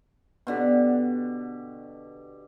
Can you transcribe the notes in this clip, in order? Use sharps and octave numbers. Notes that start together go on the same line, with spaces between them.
B2 D3 G4